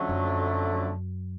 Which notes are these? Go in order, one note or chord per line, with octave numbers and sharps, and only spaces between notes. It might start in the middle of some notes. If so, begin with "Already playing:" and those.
Already playing: F2 D3 F#3 A3 C#4
F#2